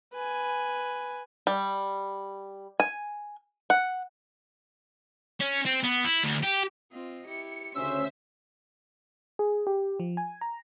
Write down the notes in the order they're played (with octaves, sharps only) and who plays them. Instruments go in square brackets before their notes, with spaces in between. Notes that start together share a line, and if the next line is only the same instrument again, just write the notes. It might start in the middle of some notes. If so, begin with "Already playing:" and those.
[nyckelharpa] B4 G#5
[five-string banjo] G3
G#5
F#5
[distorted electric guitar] C#4
C4
B3
E4
D2
G4
[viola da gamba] C4 F4 D#5
[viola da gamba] E4 G4 [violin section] C#7
[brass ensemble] D2 C#4 [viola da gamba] C#3 [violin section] C5 E5 [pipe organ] E6
[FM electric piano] G#4
G4
F3
G#5
A#5